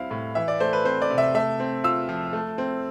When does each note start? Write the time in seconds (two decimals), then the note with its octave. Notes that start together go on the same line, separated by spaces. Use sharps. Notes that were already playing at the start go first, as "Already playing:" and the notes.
Already playing: G3 C4 E4 F5
0.11 A2
0.35 E3 E5
0.48 D5
0.60 A3 C5
0.73 B4
0.85 C4 C5
1.02 D5
1.10 C3
1.18 E5
1.35 A3 E5
1.60 C4
1.84 F4 E6
2.09 F3
2.33 A3
2.58 C4